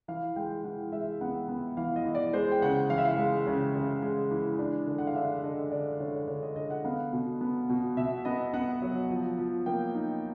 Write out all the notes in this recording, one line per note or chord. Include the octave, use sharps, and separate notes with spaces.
E3 F5
G#3 G5
E3 F#5
G#3 E5
B3 F#5
B3
E3 F5
D#5
E3
D5
G#3 C5
G5
C#3 F#5
E3 F5
E5
F5
G#3
C#3
C#3
G#3
E3
D4
D3
F#5
F5
D4 E5
D3 D#5
D3 D5
D3 C#5
D3 C#5
D#5
D3 D#5
F#5
B3 F5
B2
B3
B2
B2 E5
B3 D#5
B3 F#5
F#3
F3
F3
A#3 G5
D#4